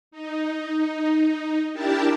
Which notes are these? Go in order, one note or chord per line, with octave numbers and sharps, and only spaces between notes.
D#4
D4 E4 G4 A#4 G5 A5